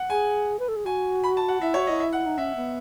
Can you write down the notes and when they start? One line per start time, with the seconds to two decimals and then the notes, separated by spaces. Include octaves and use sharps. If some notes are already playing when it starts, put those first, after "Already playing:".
Already playing: F#5
0.10 G#4 G#5
0.59 B4
0.68 A4
0.76 G#4
0.85 F#4 G#5
1.23 B5
1.37 A5
1.48 F#5
1.61 E4 E5
1.74 F#4 C#5
1.87 E4 D#5
2.00 E5
2.13 F#5
2.26 D#4
2.38 C#4 E5
2.56 B3